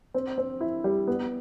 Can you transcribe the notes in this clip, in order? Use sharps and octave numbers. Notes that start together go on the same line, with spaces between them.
C4
C4
E4
G3
B3